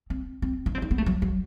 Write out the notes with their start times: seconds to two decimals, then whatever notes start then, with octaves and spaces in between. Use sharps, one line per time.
0.10 C4
0.42 C4
0.66 D#4
0.75 C4
0.82 D#4
0.91 B3
0.98 A3
1.06 F#3
1.22 F#3